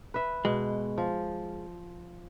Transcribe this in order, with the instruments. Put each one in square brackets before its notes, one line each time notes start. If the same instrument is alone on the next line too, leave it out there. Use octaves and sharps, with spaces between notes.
[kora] B4 E5
[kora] B2 [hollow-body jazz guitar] G#3
[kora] F3